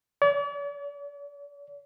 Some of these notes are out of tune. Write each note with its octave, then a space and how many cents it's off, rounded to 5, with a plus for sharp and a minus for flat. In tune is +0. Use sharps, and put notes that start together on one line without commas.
D5 -45